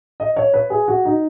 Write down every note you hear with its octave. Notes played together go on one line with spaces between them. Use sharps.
D#5
C#5
B4
G#4
F#4
D#4